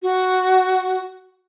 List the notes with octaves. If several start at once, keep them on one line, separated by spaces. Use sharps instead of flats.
F#4